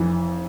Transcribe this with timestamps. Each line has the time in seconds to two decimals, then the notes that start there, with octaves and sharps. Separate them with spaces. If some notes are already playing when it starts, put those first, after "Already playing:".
Already playing: F1 F2 E3